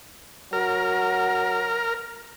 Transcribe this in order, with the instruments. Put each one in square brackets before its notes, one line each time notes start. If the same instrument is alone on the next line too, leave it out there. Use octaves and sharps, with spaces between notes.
[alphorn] F#3 [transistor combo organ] A#4